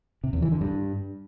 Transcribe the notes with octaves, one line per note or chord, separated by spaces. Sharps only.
C3
E2
E3
D3
G2